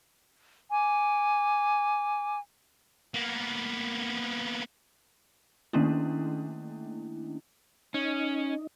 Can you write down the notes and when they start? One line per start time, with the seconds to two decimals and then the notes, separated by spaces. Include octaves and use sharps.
0.72 G#5 D6
3.14 A#3 B3
5.73 D#3 A3 A#3 C#4 D4 E4
7.94 C#4 D#4